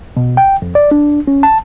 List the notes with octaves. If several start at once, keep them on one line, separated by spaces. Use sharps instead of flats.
B2
G5
F2
D5
D4
C#4
A5